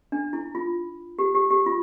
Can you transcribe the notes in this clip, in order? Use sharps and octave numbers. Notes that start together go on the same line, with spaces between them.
D4
E4
F4
G4
G4
G4
F4